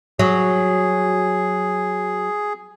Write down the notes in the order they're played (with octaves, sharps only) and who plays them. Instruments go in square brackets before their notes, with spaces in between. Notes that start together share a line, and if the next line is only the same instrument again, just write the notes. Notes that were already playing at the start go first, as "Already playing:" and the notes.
[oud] F#3 [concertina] G#4